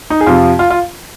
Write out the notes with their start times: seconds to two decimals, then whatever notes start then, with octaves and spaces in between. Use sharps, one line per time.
0.10 D#4
0.21 G#4
0.27 F2 C3 F3 F4
0.59 F4
0.70 F4